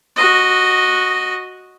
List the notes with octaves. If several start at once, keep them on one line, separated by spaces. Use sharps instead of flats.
F#4 D#5